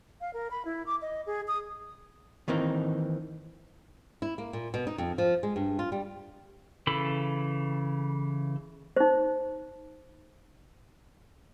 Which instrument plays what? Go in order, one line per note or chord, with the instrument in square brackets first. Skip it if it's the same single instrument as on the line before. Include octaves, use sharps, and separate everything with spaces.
[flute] F5
A#4
B5
E4
D6
D#5
G#4
D#6
[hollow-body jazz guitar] D#3 E3 A#3 C4 D#4
[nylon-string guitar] E4
A#3
A#2
B2
D#4
F2
F3
G#3
G2
F4
G3
[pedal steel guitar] C#3 E3 A4 B5
[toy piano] D#4 C5